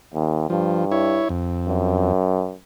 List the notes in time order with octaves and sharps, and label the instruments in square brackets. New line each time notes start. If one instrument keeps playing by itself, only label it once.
[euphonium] D#2
[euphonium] G2 [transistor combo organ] F3
[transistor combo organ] E4 C#5
F2
[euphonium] F#2